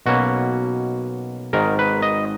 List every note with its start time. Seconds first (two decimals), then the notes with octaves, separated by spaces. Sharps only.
0.06 B1 B2 A#3 C#4 F#4
1.53 G#1 G#2 D#3 A#4
1.79 B4
2.02 D#5